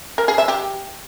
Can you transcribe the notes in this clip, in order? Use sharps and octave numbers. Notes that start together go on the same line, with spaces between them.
A#4
G#4
E5
G4